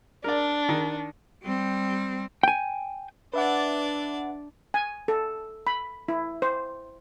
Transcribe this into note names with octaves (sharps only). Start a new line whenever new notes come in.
D4 A#4 D5
D#3
G3 C4
G5 G#5
D4 B4 D5 E5 F#5
G#5
A4
B5
E4
C5